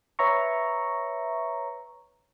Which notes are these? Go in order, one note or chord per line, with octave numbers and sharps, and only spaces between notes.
B4 C#5 E5 A#5 C#6